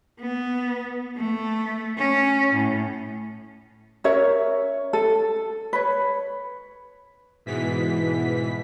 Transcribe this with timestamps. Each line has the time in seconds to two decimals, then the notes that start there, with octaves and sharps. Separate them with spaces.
0.20 B3
1.17 A3
1.98 C#4
2.54 A2
4.04 C#4 A#4 C#5 E5
4.93 A4
5.73 B4 C#5
7.46 G#2 B2 E3 B6